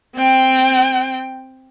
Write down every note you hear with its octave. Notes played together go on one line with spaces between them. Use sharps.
C4 G5